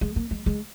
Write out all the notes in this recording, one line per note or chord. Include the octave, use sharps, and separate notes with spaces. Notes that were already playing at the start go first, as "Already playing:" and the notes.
G#3
A#3
G#3
G#3